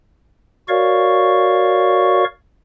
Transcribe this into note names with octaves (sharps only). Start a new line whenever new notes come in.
F#4 A#4 C#5 D5 F5 C#6